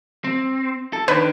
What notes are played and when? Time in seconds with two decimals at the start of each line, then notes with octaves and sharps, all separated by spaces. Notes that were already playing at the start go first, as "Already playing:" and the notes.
0.24 C4
0.93 A4
1.08 D#3 D4 B4